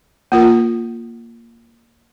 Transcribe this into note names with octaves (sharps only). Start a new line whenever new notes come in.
A#3 F4 A#4